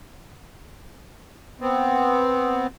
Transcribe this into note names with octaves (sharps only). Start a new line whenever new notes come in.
B3 C4